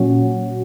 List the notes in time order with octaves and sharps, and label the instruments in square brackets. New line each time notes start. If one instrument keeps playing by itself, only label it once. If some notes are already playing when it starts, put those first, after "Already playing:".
Already playing: [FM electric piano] A#2 F#3 C#4 F#4